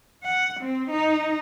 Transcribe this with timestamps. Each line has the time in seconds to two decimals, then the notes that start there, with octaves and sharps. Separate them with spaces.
0.23 F#5
0.61 C4
0.91 D#4